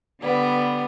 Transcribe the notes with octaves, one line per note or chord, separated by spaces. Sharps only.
D3 G3 B3